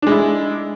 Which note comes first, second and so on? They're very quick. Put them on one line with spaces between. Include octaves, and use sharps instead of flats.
D4 G#3 E4